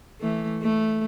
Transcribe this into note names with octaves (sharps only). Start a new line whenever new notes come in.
E3 A3
A3